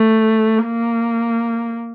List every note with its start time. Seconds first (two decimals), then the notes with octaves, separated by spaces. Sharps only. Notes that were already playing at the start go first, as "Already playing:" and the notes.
Already playing: A3
0.65 A#3